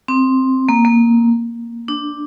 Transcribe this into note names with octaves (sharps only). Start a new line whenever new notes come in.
C4
A#3
A#3
D4